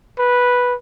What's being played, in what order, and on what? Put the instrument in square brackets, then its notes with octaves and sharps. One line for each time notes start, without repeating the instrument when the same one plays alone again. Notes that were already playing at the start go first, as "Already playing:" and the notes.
[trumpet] B4